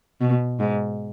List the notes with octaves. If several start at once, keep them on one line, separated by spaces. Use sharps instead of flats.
B2
G#2